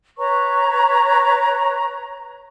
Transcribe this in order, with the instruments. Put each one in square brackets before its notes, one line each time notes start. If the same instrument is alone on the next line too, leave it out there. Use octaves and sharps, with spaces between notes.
[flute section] B4 C#5 A#5 C#6